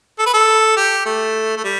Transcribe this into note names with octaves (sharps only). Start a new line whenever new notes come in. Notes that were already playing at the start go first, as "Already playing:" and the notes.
A4
B4
A4
G4
A3
A3
G3